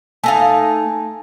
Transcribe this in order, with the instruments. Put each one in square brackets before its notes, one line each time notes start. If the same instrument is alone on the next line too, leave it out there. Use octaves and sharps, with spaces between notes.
[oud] A3 D#4 F5 [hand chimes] G#5 A5